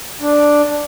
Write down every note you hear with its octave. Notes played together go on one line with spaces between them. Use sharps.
D4